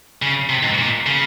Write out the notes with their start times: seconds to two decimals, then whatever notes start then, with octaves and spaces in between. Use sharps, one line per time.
0.22 C#3
0.49 C3
0.63 G#2
0.78 A#2
1.06 C#3